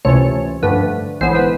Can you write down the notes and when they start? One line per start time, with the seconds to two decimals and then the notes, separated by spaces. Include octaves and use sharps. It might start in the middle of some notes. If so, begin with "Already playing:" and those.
0.05 C#2 C3 E3 A3 C#5
0.63 G2 D3 F3 A3 B4
1.21 B1 A2 E3 G#3 B3 C5
1.35 B4